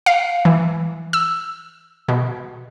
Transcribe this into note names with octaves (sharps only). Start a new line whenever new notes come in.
F5
E3
E6
B2